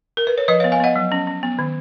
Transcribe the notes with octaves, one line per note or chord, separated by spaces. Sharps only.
A#4
B4
C#5
F3 B4 D#5
B3 C#5 F5
F5 G#5
B3 D#5 F#5
F#3
C#4
C#4
B3
D#3